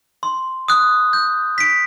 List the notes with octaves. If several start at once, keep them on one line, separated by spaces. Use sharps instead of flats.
C6
D#6 F#6
G6
B6 D7